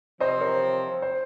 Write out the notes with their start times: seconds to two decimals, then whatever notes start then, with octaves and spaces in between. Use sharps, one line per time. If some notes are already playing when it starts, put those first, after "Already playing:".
0.20 C3 F3 C4 C5 D#5
0.40 A#4 C#5
1.02 C5